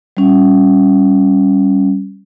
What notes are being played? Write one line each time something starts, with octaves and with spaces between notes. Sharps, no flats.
G3 C#4